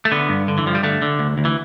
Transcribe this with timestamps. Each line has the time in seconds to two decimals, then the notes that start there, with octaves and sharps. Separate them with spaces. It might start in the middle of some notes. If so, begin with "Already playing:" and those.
0.05 A3
0.12 D3 B3
0.29 G2
0.48 D3
0.58 E3
0.66 G2 F3
0.75 G3
0.83 D3 A3
1.02 D3
1.19 D2
1.38 D2
1.45 E3